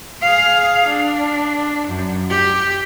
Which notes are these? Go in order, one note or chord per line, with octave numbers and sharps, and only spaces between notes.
G#4 F5
D4
F#2
G4